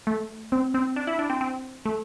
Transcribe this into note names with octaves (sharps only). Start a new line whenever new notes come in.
A3
C4
C4
D4
E4
D4
C4
C4
A3